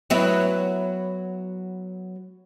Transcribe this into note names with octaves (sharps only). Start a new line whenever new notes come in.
F#3 B3 E4